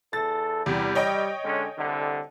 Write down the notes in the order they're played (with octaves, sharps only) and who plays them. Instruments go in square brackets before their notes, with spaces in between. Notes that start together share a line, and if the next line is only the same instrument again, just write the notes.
[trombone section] E2 A4 [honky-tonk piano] A6
[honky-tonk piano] E2 C3 [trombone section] G3
[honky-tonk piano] C#5 D#5 G5
[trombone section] D3 G#3 C#4
C2 D3